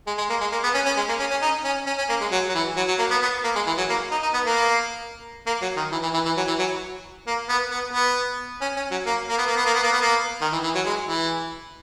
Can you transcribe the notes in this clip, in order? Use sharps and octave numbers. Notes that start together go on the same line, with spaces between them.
G#3
G#3
A#3
G#3
A#3
B3
C#4
C#4
G#3
A#3
C#4
C#4
D#4
C#4
C#4
C#4
A#3
G#3
F#3
F#3
E3
F#3
F#3
A#3
B3
B3
A#3
G#3
E3
F#3
A#3
D#4
D#4
B3
A#3
A#3
F#3
D#3
E3
E3
E3
E3
F#3
E3
F#3
A#3
B3
B3
B3
C#4
C#4
F#3
A#3
A#3
B3
A#3
B3
A#3
B3
A#3
B3
A#3
D#3
E3
E3
F#3
G#3
E3